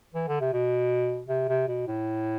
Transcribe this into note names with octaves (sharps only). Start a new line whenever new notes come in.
E3
D3
C3
B2
C3
C3
B2
A2